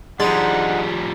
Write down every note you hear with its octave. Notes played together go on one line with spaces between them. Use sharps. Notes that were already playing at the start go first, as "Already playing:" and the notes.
F3 G3 G#3 D4 D#4 F#5